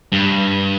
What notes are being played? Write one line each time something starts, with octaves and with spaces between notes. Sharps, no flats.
G2